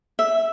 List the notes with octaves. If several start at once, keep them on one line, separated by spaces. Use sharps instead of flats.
E5